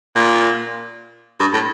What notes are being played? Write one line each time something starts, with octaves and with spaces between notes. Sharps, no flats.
A#2
G2
A2